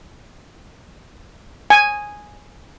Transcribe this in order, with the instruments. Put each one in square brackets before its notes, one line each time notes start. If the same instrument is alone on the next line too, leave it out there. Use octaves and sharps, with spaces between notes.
[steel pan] G#5